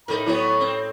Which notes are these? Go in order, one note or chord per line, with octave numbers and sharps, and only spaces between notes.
A2 D#4 G4 A#4 B5
F#3 B3 E4 C#5
C4